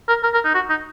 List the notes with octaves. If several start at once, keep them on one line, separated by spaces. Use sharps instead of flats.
A#4
A#4
A#4
D#4
F#4
D#4